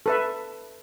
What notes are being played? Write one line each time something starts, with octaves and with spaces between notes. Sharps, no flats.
A4 B4 E5